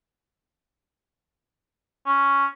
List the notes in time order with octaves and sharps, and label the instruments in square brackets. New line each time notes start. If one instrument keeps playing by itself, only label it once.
[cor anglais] C#4